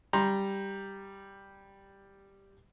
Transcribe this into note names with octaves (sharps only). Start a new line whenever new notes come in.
G3 A#5 C6